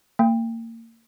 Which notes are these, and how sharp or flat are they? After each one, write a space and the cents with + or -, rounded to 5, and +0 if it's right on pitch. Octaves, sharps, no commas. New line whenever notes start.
A#3 -30 G5 +20